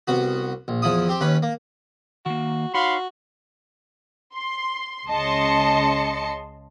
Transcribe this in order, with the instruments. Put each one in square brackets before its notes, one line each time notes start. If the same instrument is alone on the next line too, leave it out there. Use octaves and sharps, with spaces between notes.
[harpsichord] C2 B3 F#4
A#1
E2 F3 E4 D#6
C4 G4
D#2 C#4 B4
A#3
[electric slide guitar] D#3 A#3 [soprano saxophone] F#4
[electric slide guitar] D#4 C#5 [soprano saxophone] F#4 [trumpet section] F5 B5 C6
[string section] C6
C#2 C#3 D#5 A5 C6 C#7